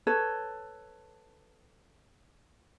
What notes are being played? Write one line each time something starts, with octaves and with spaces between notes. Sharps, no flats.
A4 B4 C#5